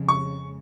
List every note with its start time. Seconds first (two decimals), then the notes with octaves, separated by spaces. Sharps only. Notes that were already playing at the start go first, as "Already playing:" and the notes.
Already playing: F2 C#3 G#3
0.08 C#6